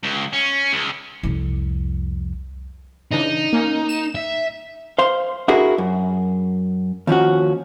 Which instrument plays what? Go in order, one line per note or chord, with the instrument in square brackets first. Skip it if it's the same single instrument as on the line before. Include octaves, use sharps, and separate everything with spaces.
[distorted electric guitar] C#2
C#4
C#2
[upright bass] C2 F2
[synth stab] C#3 E3 D4 [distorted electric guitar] D#4
[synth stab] A#3 C#4
E7
[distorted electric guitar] E5
[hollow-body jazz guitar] C5 F5 C6
D4 E4 F#4 G#4 A#4
F#2
D#2 F3 C#4 F#4